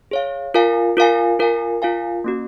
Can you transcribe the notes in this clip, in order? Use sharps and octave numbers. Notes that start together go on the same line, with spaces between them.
G#4 C#5 F5
F4 A#4 F5 G#5
F4 A#4 F5 G#5
F4 A#4 F5 G#5
F4 A#4 F5 G#5
A#3 C#4 F#4